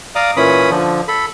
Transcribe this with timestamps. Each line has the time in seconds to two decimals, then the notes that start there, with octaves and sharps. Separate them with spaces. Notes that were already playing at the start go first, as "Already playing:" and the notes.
0.15 D5 F5 A#5 D6 D#6
0.37 A#2 E3 C#4 B5 D#6
0.70 D3 F3
1.08 A4 B5